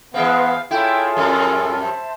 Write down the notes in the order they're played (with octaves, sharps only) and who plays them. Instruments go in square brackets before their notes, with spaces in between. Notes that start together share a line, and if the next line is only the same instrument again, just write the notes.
[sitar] E3 G#3 C4 [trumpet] B3 [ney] F5
[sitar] A3 E4 [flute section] F4 A4 C#5 [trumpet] G#4 [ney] G5
[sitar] F2 A2 G3 [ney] A#4
[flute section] C5 E5 A5